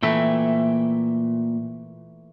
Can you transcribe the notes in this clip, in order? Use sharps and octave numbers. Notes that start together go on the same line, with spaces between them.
A#2 E3 A3 A#3 E5 G5